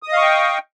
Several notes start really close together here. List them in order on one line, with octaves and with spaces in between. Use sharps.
D#6 D#5 F5 C#6 G5